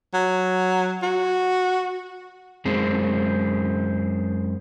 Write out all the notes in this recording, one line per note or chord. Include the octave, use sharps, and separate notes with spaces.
F#3
F#4
F#2 G#3 C4